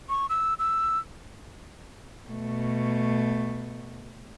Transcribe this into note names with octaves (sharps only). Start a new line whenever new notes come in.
C#6
E6
E6
B2 A3